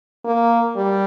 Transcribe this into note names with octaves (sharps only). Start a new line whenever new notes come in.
A#3
G3